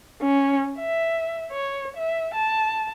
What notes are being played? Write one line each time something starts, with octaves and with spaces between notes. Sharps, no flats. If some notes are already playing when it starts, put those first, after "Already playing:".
C#4
E5
C#5
E5
A5